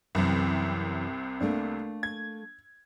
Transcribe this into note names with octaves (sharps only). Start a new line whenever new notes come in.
C2 F#2 C3 E3
A3 A#3 D4
G#6